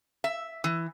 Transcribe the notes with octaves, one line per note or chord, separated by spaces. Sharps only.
E5
E3